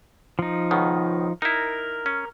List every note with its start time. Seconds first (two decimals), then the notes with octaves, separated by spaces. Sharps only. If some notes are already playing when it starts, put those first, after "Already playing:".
0.39 F3 D#4
0.71 C#2 B2 D#3
1.42 D#4 E4 A#4
2.06 C#4